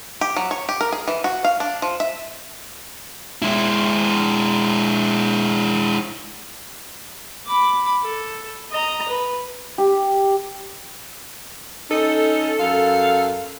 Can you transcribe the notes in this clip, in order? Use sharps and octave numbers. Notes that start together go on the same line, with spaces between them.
G4
F#3
C#5
G4
A#4
G#4
E3
F#4
F5
D4
F3
E5
G#3 E4
B5 D6
A4
D#5 A#5
B4
G4
C#4 D#4 A4
F#2 F5